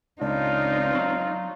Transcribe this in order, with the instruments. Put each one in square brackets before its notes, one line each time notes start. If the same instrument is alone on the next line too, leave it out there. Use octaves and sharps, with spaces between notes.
[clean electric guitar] C#2 [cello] C4 D#4 [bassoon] D4 [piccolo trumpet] F4
[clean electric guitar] F#3